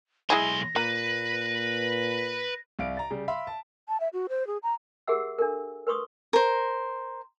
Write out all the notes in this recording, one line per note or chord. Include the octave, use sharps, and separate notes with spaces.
B1 G#3 E4 G#4 C6 A#6
A#2 A#3 B4
C2 F5 D7
A#5 A6
C#3 G3
E5 F5 B5 C6
A5
A5
E5
F#4
C5
G#4
A#5
G4 G#4 A#4 E5 F#5 E6
D4 A4 A#4
A#4 B4 C6 C#6 D#6
A#4 C5